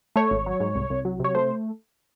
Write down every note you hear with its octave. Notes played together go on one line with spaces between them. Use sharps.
A3 C#5
G#1
F#3
G#2
C2
C2
F#3
C3 C#5
A3 C5